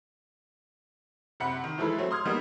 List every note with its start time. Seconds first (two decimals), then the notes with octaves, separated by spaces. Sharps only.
1.40 F#1 C3 F#5 B5
1.64 D#3
1.78 E3 F3 G#3 E4 A4 B4
1.98 F#3 A3 C4
2.11 C6 D#6 F6 G#6
2.25 G3 A#3 B3 D#4